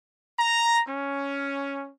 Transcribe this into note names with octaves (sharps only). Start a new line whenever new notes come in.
A#5
C#4